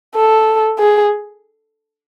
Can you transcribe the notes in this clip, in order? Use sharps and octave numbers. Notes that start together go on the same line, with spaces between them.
A4
G#4